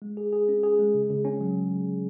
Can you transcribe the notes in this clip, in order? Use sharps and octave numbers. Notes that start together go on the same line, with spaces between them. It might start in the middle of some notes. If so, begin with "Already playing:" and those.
G#3
G#4
G#4
C#4
G#4
G#3
C#3
C#3
C#4
F#3